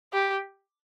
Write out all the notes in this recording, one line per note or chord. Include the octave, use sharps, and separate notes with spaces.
G4